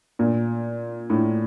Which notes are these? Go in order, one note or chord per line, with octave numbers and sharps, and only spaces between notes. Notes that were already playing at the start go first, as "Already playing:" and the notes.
A#2
A2